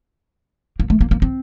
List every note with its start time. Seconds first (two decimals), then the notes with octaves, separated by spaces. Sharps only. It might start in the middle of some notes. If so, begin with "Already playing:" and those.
0.80 A#3
0.90 A3
1.01 A#3
1.11 A#3
1.22 C4